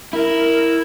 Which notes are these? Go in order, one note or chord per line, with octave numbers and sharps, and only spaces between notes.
E4 A#4